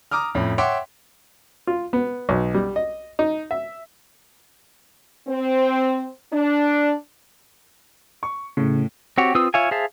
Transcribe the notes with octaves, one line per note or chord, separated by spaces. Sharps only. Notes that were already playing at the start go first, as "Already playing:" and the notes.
A#5 D6 D#6 F6
F2 A2 C#4
C#5 E5 F#5 G5 C6 D6
F4
B3
B1
G3
D#5
D#4
E5
C4
D4
C#6
A2 C#3
C4 F#4 G4 C#5
C4 F4 B4 D#6 E6
F4 C#5 E5 F5 G#5
G#4 C5 E5 F5 A5